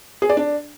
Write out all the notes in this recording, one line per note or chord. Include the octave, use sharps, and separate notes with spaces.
G#4
D5
D4